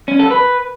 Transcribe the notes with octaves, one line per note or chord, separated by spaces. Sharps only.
C#4
A4
B4